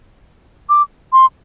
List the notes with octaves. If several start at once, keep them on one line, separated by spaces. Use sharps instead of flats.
D6
C6